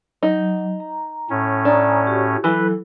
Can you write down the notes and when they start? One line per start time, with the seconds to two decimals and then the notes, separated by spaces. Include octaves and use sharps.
0.23 F#3 D#4
0.80 A#5
1.30 A2 C#4
1.65 D4 G#5 A#5 D#6
2.07 F#4 G4
2.44 E3 F#3 E4 A4 B4